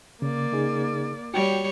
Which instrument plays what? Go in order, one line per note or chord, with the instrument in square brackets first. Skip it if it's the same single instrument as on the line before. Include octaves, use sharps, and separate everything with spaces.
[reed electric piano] C#3 [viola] A#3 D5
[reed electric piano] C#3 D#4 G#4
[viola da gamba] G3 C#5 [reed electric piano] F#4 G5